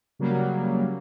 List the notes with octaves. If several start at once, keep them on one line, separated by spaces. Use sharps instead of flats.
C#3 F#3 G3 A#3